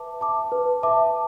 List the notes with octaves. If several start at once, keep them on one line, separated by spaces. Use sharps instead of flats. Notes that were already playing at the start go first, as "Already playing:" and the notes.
Already playing: B4 E5 A5 D6
E5 A5 D6
B4
E5 A5 D6